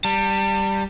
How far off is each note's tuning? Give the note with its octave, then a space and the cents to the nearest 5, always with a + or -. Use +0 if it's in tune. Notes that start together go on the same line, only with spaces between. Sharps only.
G3 +0 A5 +45